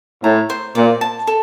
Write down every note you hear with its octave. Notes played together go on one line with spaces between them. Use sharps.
A2 A#5
C5
A#2 D5
A5
A4